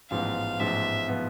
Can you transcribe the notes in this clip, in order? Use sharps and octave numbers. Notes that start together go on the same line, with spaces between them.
A1 G#2 F3 B3 F5
A1 G#2 F3 B3 E5
F3 B3